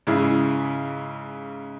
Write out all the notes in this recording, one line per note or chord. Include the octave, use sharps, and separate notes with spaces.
G#2 C#3 E4 G#4